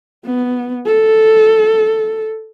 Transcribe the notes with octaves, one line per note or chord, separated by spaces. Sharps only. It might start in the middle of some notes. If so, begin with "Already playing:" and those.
B3
A4